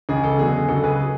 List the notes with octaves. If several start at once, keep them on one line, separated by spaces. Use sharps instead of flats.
C#2 C#3 E3 G#4
A4
E2 D3 F#3 G#4
C#2 C#3 F#3 A4
G#4 B4
F#3